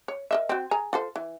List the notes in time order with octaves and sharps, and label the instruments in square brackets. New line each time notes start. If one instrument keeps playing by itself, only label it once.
[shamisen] C#5
A#4 D#5 E5
C4 F#4
G#4 G#5 A#5
F4 A4 C5
E3